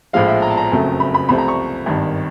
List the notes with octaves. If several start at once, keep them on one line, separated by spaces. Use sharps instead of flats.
A#1 A2 F3 G#3 F5
E5
A#5
A5
A#5
F#1 F2 C#3 F#3 A3
B5
B5
C2 C3 F3 A3 B5
A#5
C#6
G#1 G2 D#3